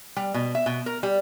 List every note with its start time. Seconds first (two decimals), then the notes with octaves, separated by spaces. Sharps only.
0.16 G3
0.34 B2
0.55 E5
0.66 B2
0.86 A#4
1.03 G3